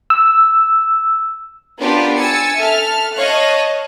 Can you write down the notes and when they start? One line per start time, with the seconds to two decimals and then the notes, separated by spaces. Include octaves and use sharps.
0.10 E6
1.79 B3 D4 F4 G4 A#4 B4
2.17 G#5 E6 A6 C#7
2.58 A4 E5 A5 F6
3.15 C#5 D#5 F5 A5 C#6 F#6